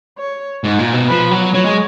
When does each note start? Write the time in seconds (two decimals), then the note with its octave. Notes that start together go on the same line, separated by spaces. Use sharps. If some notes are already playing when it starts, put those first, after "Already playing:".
0.18 C#5
0.64 G#2
0.79 A#2
0.94 B2
1.09 F3 B4
1.31 F#3
1.54 F#3 C#5
1.65 G#3